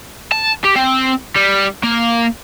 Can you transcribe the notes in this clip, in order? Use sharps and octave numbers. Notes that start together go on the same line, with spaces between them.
A5
G4
C4
G3
A#3